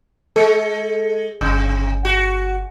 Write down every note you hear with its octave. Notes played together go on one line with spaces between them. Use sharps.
G#3 A4 C#7
G1 C3
F#4